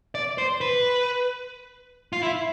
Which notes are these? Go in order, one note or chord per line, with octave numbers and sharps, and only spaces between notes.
D5
C5
B4
F4
E4